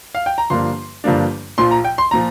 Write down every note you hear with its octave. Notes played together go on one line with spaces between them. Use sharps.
F5
G5
A#5
G1 G2 F3 A#3 D4 C6
G1 G2 F3 A#3 D4
A#1 A#2 F3 C6
A#5
G5
C6
A#2 F3 A#5